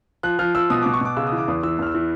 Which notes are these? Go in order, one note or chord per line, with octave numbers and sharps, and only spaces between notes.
F3 F#6
F3 F6
F3 E6
B2 D#6
B2 D6
C#6
B2 D6
C#3 E6
D#6
E3
D6
E2 D#6
E3 E6
E2 F6
E6
E3